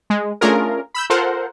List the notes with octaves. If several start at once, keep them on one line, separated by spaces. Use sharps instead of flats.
G#3
A3 C#4 D4 F4 G#4 A#4
B5 E6 G6
F4 A4 A#4 C5 F#5